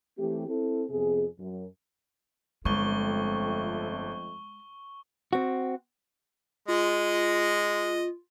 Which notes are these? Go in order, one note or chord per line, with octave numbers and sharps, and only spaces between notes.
E3 A3 C4 G4
C4 E4 A4
F2 C3 B3 G#4
F#2
G1 F2 G#3 A3 C4 C#6 G7
C4 F#4
G#3 F4 D#5